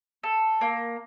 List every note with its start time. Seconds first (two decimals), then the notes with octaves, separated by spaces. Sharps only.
0.23 A4
0.61 A#3